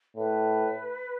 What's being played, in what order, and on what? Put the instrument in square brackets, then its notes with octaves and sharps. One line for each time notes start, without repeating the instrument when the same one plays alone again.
[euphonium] A2 [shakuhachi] B4